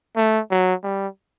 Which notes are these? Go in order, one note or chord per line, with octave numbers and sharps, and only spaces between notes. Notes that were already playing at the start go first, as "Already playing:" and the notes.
A3
F#3
G3